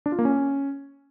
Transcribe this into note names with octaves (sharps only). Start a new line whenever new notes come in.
D4
F4
A#3
C#4